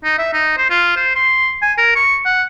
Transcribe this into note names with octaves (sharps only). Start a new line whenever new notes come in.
D#4
E5
D#4
C5
F4
C5
C6
G#5
A#4
C#6
F#5